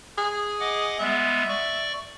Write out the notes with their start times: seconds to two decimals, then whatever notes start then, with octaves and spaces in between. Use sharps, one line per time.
0.18 G#4
0.60 D#5 F#5 D6
1.00 G3 G#3 B3 E5
1.48 D5 C#6